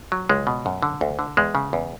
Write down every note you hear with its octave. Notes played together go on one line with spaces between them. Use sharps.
F#3
C#2 G#3
B2
F#2
D3
D2
D3
E2 G#3
C#3
E2